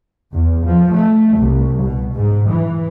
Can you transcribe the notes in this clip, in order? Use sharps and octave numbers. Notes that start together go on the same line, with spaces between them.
E2
F3
A3
C2
B2
G#2
E3